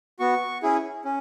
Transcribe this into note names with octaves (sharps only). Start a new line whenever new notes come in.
B3 F#4 C#6
C#4 E4 G#4
C#4